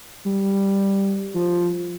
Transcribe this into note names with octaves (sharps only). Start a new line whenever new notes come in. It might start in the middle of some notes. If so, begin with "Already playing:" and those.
G3
F3